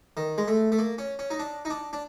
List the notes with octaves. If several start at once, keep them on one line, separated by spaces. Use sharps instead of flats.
D#3
G#3
A3
A3
A#3
C#4
C#4
D#4
D4
D#4
D4
D4